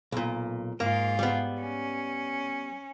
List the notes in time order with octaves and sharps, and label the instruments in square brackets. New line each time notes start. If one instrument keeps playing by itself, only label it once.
[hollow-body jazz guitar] B1 A#2
[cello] G#2 F4 [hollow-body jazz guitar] A#3
[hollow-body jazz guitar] G3 B3
[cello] C#4